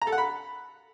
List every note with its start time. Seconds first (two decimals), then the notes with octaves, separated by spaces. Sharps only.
0.02 A#5
0.07 A4
0.12 F#5
0.18 B5